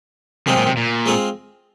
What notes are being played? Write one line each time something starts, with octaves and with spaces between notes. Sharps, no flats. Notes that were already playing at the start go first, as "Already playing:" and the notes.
F#2 C3 D#3 G#3 C4 F4
A#2
C3
A#2
G#3 C4 F4 G#4